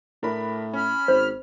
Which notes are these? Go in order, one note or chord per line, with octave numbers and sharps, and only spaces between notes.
A2 D4 A#4 B5
C#4 B5 F6
G#1 C5